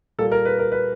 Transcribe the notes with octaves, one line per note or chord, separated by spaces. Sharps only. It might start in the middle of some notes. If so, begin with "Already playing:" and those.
A#2 G3 A#3 A4
A#4
B4
A#4
B4